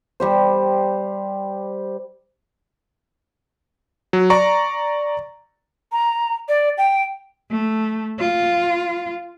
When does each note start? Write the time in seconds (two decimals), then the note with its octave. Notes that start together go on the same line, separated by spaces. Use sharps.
0.20 G3 G4 C5
4.13 F#3
4.30 D5 A#5 C#6
5.92 A#5
6.49 D5
6.78 G5
7.50 A3
8.19 F4